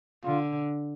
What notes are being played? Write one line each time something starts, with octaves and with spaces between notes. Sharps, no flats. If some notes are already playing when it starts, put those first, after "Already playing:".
D3 F4